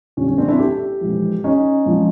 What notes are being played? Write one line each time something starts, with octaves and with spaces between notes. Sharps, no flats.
F1 F2 D3 G3 C#4
C#4
C4 D4
D4 E4
G4 A4
A#1 G#2 E3
C#4 D#4
G#1 F3